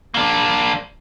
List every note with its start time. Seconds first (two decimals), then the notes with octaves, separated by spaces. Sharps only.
0.14 A#3 D4